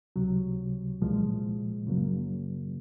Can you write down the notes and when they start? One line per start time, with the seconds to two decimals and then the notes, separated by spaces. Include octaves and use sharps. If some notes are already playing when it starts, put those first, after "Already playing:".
0.16 C#2 C3 F#3
1.02 C2 A#2 F3 G#3
1.86 F#2 C#3 F#3 A#3